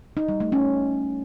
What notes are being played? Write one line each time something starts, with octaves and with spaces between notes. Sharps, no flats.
D#4
G3
A3
C#4